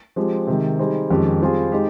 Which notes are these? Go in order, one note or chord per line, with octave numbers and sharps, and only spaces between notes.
F3 G#3 C4 G4
C3 D#3 G#3
G3 C4 D#4 G#4
F2 D#3 G#3 C#4 G4
G3 C4 F4 G#4
G#3 D#4 G4